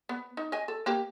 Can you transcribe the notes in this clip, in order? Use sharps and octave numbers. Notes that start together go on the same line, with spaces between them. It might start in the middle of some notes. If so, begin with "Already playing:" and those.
B3
D#4
D#5 G#5
A4
A#3 G4